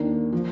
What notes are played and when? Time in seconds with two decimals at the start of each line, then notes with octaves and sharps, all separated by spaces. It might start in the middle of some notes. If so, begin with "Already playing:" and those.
Already playing: D#2 D#3 A#3 D4
0.33 F3